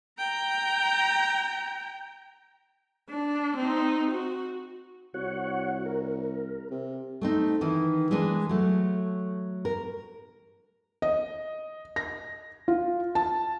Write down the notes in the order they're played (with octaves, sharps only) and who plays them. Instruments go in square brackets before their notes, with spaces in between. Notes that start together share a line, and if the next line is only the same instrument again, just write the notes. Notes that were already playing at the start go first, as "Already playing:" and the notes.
[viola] G5 A#5
D4
C4 D#4
F#4
[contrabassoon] C2 [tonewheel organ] F#4 C#5 F#5
[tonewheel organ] A#4
[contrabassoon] C3
[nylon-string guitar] A3 C4 D#4
D#3 E3 E4
E3 G#3 A#3 D4
F#3 A3
A#4
[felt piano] D#5
A#6
F4
A5